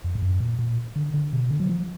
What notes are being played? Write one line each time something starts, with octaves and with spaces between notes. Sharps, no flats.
F2
G#2
F#2
A#2
A#2
D3
D3
B2
D3
F#3
F3